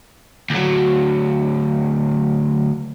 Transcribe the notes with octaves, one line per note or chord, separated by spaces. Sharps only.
D2 F#3